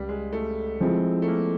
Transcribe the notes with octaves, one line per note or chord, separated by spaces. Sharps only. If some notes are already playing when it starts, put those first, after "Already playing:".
Already playing: C#2 G3
G#3
A3
F3 G#3 C4 E4
A3
A#3